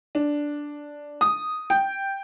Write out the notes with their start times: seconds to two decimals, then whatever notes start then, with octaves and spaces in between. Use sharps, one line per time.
0.15 D4
1.21 D#6
1.70 G5